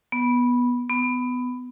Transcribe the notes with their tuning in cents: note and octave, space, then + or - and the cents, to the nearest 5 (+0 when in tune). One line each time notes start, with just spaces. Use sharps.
B3 -10
B3 +15